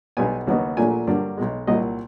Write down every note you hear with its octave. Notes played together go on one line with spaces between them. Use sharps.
B1 B2 G3 B3 G#5
D#2 C#3 F#3 B3 D#4
A#1 A#2 F#3 A3 D4 G#5
G2 D3 F#3 A#3 D4
B1 B2 G#3
C2 A#2 F#3 A#3 D#5